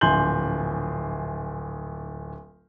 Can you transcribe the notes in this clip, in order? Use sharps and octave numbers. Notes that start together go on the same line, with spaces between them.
D1 A#1 G#5 C6 G6 F#7